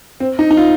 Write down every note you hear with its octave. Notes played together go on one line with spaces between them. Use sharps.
C4
D#4
D#4
F4